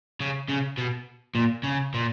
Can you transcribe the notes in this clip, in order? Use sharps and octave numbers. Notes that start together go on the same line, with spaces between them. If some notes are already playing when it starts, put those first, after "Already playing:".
C#3
C#3
B2
A#2
C#3
A#2